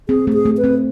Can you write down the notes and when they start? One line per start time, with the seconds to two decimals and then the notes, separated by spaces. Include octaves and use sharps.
0.08 C4 G#4
0.27 A3
0.33 G#4
0.46 A3
0.58 B4
0.64 C4